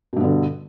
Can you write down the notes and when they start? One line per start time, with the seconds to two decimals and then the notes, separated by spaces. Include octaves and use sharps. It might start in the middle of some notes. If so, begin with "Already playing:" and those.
0.13 B2
0.17 G2
0.20 B3
0.24 D3